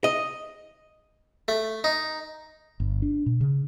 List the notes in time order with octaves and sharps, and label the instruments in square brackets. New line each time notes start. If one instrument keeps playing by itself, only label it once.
[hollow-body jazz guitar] D#5
[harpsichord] A3
D#4
[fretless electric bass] G1
D4
B2
C#3